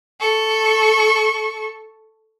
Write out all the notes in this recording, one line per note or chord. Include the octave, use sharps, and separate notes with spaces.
A4 C#6